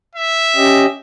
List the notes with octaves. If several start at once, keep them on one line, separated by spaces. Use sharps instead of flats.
E5
C#4 G4 D#5